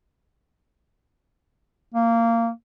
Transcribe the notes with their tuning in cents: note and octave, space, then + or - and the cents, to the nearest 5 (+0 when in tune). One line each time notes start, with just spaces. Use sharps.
A#3 -20